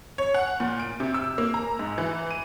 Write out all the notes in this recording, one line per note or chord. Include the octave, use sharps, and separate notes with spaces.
C#5
F#5
A#2
D7
C3
E6
A#3
A#5
G#2
E3
D#7